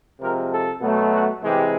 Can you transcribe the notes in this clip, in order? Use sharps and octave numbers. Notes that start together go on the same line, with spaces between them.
C3 F3 G#3 A#4
A4
B2 F#3 A3
F#4
C3 E3 G#3 G4